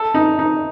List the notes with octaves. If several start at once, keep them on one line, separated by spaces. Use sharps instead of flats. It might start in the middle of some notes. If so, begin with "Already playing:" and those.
Already playing: A4
D#4
D#4